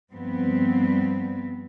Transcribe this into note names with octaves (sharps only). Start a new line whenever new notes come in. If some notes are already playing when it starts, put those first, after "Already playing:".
G2 F3 G3 B3 C4